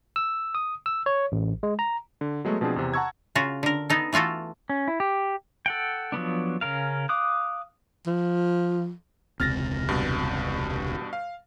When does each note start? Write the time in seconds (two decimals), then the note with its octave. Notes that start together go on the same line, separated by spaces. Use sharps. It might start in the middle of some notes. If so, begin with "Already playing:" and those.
0.16 E6
0.55 D#6
0.86 E6
1.06 C#5
1.32 A1
1.63 G#3
1.79 A#5
2.21 D3
2.45 F#3 G#3 A3 B3
2.61 B2 F3 C4 D4 G#4
2.76 E2 C3
2.94 F#5 A5 A#5 C#6 E6 G#6
3.35 C#3 F4 F#4
3.63 D3 A#4
3.90 B3 D#4 A4
4.13 E3 A3 F4 F#4 A4
4.70 C#4
4.88 E4
5.00 G4
5.66 A4 F#5 G5
6.12 F3 F#3 B3 D4
6.61 C#3 C#4 A#4 F5
7.09 F5 D6 D#6 F#6
8.07 F3
9.40 E1 C#2 C3 F6 A6 A#6
9.89 G2 B2
11.13 F5